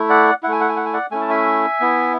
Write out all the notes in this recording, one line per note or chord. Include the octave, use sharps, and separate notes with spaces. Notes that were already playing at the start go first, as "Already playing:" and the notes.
Already playing: A3 E4
D5 F#5
A3 E4 F#5 G#5
F#5
G#5
F#5
G#5
D5 F#5
A3 C#4 E4 G#5
A5
E5 G#5
B3 E4